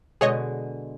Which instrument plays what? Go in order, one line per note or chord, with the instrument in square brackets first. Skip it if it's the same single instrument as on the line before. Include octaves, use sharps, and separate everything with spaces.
[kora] B2 D3 G#3 [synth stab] G#4 C#5 D#5